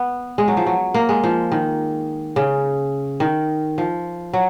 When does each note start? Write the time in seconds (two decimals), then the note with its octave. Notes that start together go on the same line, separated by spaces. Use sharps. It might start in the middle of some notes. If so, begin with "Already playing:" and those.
Already playing: B3
0.38 G#3
0.48 F#3
0.57 F3
0.67 F#3
0.94 A#3
1.09 G#3
1.23 F3
1.52 D#3
2.36 C#3
3.20 D#3
3.78 F3
4.33 F#3